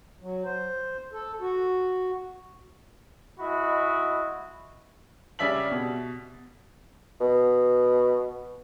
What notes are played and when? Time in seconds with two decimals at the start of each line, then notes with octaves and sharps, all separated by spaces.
0.21 F#3
0.45 C5
1.12 A4
1.41 F#4
3.39 G#3 E4 F#4 D#5 B5
5.39 C#3 G3 D5 E5 B6 F#7
5.71 B2
7.21 B2